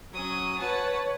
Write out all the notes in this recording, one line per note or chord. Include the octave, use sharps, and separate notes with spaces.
F#3 C#4 D#6
B4 C#5 F#5 A5